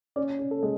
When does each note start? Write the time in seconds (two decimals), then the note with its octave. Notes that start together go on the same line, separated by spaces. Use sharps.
0.16 C#4 D5
0.39 C#4
0.51 A4
0.63 G#3